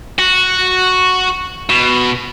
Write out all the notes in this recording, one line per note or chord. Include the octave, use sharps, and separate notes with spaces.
F#4
B2